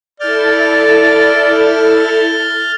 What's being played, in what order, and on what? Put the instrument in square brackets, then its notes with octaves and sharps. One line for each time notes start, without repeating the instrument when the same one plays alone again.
[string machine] E4 A4 [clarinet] D5 [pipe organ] F6 G6 A6